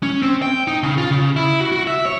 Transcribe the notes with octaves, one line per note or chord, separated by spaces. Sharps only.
C#4
C4
G5
D#4
C#3
F4
C#3
E4
F#4
F#4
E5
C#5